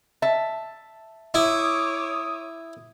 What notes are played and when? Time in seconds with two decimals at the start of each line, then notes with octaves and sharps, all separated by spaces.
0.22 E5 A5
1.34 E4 C#5 D6 D#6